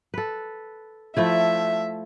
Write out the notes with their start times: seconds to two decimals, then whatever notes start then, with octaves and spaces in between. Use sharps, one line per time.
0.14 A4 B4
1.17 F3 A3 E4 E5